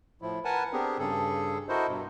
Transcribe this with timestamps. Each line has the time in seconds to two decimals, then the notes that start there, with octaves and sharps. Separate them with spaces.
0.22 A2 F3 E4
0.45 A#4 B4 F#5 G#5 A5
0.73 B3 C4 D4 G4 G#4 A#4
0.98 G2 C#3 G#4 A4
1.69 E4 F#4 A4 A#4 C5 D#5
1.88 G2 B2